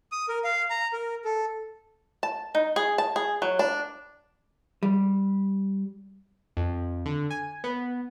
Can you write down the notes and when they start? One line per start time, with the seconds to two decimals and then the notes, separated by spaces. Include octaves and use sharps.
0.12 D#6
0.29 A#4
0.44 F5
0.70 A#5
0.93 A#4
1.25 A4
2.23 A5
2.55 D#4
2.76 G#4
2.98 A5
3.16 G#4
3.42 F#3
3.59 D4
4.83 G3
6.57 F2
7.06 D3
7.30 G#5
7.64 B3